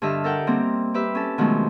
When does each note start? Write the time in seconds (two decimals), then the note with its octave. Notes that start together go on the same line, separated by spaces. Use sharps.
0.02 G2 D3 G3 D#5 E5 F6
0.24 A4 A#4 F#5 G5
0.47 G3 A#3 C4 A#5
0.94 G4 B4 E5
1.15 C#4 A4
1.38 B2 D#3 F3 F#3 G#3 A3